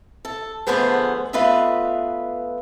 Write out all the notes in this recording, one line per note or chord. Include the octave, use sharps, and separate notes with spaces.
A4
D3 F3 A3 B3 G#4 C5
A3 B3 F4 B4 D#5 E5